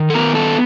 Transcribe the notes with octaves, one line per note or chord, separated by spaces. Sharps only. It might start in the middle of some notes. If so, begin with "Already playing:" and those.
Already playing: D#3
A4
B3 A#4
A4